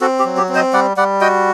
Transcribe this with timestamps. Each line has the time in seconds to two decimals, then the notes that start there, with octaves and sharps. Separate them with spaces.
0.01 C4 F#4 A4
0.19 G4
0.25 F#3
0.37 G4
0.49 C4
0.55 C5 D#5
0.73 G3 D5 F#5
0.97 G3 D5 F#5
1.21 F#4 D#5 G5